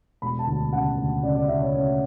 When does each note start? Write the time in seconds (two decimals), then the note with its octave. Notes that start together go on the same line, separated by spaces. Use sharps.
0.22 E1 B5
0.39 A5
0.47 D2
0.72 C#3 F#5
0.98 D2
1.23 C#3 D5
1.36 D5
1.48 C#3 E5
1.60 C#5
1.73 C#3 C#5